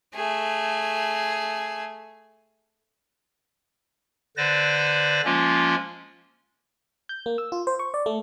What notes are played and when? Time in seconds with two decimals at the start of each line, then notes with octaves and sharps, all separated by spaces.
0.14 A3 G#4
4.37 D3 B4 C5 D5 A#6
5.25 F3 G#3 A#3 C#4 F4
7.09 G6
7.26 A#3
7.38 E6
7.52 F4
7.67 C5
7.79 C#6
7.94 D5
8.06 A3